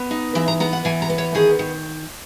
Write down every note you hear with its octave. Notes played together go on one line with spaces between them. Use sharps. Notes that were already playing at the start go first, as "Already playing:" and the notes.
Already playing: B3
D#4
E3 E5
A#5
B3 A#5
F#5
E3 G#5
A#5
B3
C#5
D#3 G#4
D#3